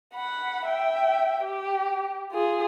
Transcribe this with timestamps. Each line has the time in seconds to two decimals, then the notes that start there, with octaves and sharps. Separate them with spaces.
0.14 F#5 B5
0.66 E5 G5
1.44 G4
2.32 F4 G#4